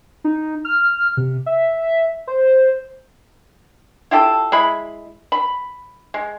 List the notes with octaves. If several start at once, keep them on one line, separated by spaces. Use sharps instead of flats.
D#4
F6
C3
E5
C5
E4 F4 G4 A4
G#3 E4 B5
B5
G#3